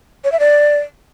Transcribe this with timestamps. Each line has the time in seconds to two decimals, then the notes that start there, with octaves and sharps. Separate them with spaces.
0.24 C#5
0.32 E5
0.40 D5